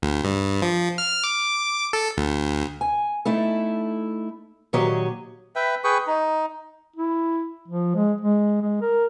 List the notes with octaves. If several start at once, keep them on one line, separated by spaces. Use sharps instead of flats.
D2
G2
F3
F6
D6
A4
D2
G#5
A3 D#4 E4 A4
A#2 D#3 F#3 G4 C#5 D#5
B4 E5 G5
G#4 B4 G5 C#6
D#4
E4
F3
G#3
G#3
G#3
A#4